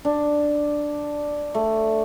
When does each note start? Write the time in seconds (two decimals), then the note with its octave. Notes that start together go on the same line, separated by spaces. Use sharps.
0.05 D4
1.54 A3